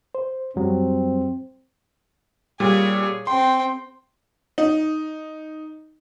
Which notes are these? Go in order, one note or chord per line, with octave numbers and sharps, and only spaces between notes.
C5
F#2 F#3 G3 C4
A#2 G3 G#4 C#5
C4 G5 C6
D#4